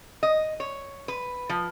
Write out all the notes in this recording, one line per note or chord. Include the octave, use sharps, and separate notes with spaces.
D#5
C#5
B4
F3